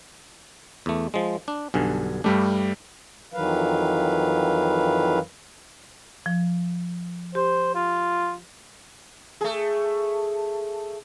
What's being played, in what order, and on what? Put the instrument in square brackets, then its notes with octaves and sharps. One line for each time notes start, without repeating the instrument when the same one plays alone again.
[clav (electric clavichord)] E2 A3
F3 G#3
D4
[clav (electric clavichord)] B1 G2 D3 [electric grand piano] G#5
[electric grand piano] G2 G3 A3 [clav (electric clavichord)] D4
[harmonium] F2 D#3 E3 F#3 B4 F5
[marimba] F3
[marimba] G4 [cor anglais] C5
[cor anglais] F4
[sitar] A3 G#4